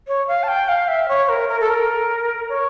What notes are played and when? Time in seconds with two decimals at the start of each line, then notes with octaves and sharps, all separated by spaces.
0.08 C#5
0.28 F5
0.43 A5
0.48 G5
0.68 F5
0.88 E5
1.09 C#5
1.29 A#4
1.48 A#4
1.60 A4
1.70 A#4
2.49 C#5